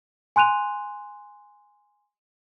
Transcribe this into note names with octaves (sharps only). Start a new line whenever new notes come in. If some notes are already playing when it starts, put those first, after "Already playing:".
G#5 C6 F#6 D#7 F7